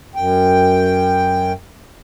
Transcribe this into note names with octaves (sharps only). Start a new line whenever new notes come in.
F#2 G5